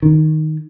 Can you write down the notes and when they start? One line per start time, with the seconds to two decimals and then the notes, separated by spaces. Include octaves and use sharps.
0.02 D#3